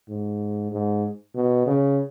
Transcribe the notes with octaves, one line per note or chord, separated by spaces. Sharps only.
G#2
G#2
B2
C#3